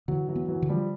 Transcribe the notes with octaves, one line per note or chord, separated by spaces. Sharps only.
D3 E3 F#3
E3 F#3
B3
E3 F#3
D3
F3 G3